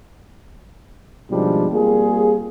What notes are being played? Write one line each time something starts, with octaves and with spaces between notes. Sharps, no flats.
G#1 B2 F3 G3 G#3 D4
G3 A#3 C4 F4 G#4